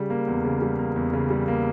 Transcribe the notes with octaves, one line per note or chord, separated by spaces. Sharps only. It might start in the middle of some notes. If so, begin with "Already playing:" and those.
Already playing: C#3 G3
A#3
E2
C#3
G3
A#3
E2
C#3
G3
A#3